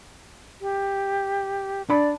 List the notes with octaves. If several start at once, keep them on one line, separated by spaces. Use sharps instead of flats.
G4
D4 D5 B5